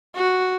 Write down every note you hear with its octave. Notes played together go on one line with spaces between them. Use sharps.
F#4